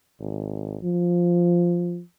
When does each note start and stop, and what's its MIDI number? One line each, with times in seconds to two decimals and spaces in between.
0.20 0.76 32
0.83 2.01 53